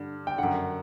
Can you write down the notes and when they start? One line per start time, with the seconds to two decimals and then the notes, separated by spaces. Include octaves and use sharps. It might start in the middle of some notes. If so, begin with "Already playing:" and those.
Already playing: G2 D3
0.27 G5
0.38 F#2 D3 F#5